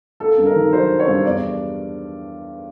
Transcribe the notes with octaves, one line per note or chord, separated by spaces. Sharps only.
A#3 A4
G2
A#4
D#3
F#3 C5
A#3
C#5
G2
E2 D5